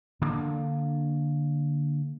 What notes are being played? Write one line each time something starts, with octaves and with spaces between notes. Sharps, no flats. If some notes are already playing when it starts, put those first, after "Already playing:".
D3 A#3 D4